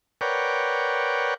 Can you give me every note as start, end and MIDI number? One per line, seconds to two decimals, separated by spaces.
0.21 1.34 70
0.21 1.34 71
0.21 1.34 73
0.21 1.34 74
0.21 1.34 78
0.21 1.34 79